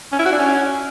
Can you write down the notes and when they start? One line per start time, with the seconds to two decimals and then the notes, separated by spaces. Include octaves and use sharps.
0.12 C#4
0.19 E4
0.25 F#4
0.32 D4
0.39 C#4